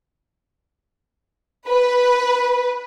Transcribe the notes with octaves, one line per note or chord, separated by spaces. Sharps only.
B4